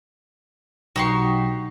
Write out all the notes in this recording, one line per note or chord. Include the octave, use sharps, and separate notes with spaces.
B1 D#4 F#4 G4 C#6 C7